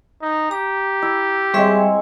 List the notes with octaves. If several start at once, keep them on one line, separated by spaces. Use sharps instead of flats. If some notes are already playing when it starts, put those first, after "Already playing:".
D#4
G4 A#5
E4
G3 G#3 C4 G#4 C#5 E5